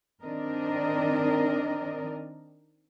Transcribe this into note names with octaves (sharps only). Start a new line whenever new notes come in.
D#3 C4 D4 A#4 D5 D#5